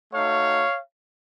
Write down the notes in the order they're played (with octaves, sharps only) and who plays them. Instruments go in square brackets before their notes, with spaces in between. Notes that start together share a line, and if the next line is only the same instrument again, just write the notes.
[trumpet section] A3 D#4 F#4 C#5 F5